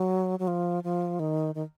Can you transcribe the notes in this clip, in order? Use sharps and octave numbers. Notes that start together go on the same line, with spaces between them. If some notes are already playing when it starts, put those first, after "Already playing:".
Already playing: F#3
F#3
F3
F3
D#3
D#3